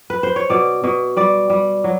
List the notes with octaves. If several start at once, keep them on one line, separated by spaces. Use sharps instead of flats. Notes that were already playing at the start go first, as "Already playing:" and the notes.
B4
C5
C#5
B2 D5
B2
G3 D5
G3
F#3